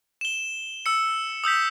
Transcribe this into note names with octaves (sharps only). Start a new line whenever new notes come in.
E7 G7
E6 C#7
D#6 E6 G6 B6